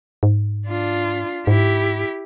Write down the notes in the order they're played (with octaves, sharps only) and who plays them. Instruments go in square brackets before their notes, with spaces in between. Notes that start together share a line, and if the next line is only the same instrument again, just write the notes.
[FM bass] G#2
[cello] D4 F4
[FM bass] G#2 [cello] E4 G4